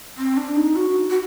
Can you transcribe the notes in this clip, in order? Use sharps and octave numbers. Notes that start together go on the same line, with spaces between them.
C4
D4
D#4
F#4
F#4